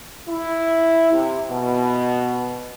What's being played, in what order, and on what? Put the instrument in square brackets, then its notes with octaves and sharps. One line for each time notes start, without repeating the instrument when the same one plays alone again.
[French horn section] E4
C3
B2